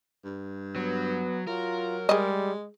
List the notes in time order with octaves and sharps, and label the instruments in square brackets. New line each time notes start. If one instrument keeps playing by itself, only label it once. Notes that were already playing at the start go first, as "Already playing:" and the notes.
[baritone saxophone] G2
[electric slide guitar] F#3 [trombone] B3
[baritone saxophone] F#3 [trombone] F4 [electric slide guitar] A#4
[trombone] G3 [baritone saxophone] G#3 [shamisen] G#4 D#5